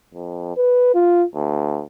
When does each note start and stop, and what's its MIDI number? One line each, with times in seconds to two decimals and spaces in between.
0.14 0.55 41
0.57 0.90 71
0.95 1.24 65
1.35 1.83 38